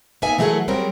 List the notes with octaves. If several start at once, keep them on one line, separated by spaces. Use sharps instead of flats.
A#3 B3 D#4 E5 G#5
E3 F#3 A3 G#4 A#4 F#5
F#3 G3 C4 F#4 G#4 A#4